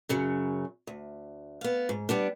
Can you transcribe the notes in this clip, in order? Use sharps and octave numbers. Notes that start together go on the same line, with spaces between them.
F#2 C#3 F#3
D2
B3 F5
G#2
G3 B3 D4